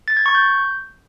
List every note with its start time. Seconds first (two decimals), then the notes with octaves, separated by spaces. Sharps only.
0.08 A6
0.17 G#6
0.26 C#6
0.35 G6